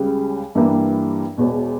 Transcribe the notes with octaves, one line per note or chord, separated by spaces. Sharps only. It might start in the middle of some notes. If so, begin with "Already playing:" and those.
Already playing: C#2 C#3 G3
G2 E3 G3 A#3
E1 E2 B2